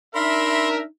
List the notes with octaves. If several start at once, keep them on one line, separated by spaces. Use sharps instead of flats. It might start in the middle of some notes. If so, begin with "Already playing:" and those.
D4 D#4 A#4 E5 B5 C6